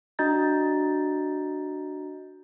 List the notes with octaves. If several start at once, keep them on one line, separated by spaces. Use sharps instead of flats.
D4 F#4 D#5 A#5 G6 A6